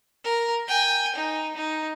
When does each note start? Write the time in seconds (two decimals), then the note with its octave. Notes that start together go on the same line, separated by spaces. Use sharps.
0.24 A#4
0.67 G5 G#5
1.16 D#4
1.56 D#4